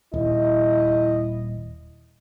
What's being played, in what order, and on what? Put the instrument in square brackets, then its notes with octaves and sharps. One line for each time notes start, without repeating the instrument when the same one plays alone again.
[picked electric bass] D#1 [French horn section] E4 D#5